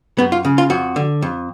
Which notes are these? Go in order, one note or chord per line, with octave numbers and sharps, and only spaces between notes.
F#2 B3
F4
C#3
F4
F2 F#4
D3
F2